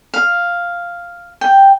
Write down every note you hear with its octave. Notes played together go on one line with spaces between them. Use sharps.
F5
G5